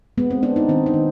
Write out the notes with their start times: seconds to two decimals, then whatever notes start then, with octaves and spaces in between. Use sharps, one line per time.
0.18 G#3 B3
0.30 C4
0.43 B3 D4
0.56 D#4
0.69 D#3 C4
0.86 D#4
0.94 D#3